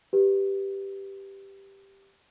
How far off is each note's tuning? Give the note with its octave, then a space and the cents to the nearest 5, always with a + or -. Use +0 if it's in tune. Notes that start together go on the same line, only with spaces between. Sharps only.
G4 +0 B4 +0